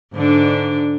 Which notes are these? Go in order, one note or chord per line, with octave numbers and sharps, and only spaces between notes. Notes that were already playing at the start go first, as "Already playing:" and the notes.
G#2 D3 D4